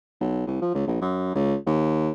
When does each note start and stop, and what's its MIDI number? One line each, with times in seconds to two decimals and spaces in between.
0.21 0.43 35
0.47 0.61 36
0.62 0.70 53
0.74 0.86 37
0.88 0.97 34
1.02 1.33 42
1.35 1.56 37
1.67 2.12 39